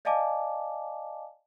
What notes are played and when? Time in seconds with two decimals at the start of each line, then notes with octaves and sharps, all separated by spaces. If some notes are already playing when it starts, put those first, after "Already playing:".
0.05 D5 D#5 F5 G#5 A5 D6